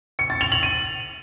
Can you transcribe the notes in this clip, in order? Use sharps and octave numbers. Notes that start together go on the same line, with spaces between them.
C#7
A6
F7
F#7
D#7